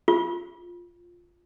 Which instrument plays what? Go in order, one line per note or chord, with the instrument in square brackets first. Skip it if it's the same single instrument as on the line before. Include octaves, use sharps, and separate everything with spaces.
[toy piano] F4